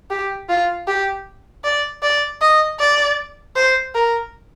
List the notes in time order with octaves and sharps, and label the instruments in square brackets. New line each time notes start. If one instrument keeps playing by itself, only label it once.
[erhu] G4
F4
G4
D5
D5
D#5
D5
C5
A#4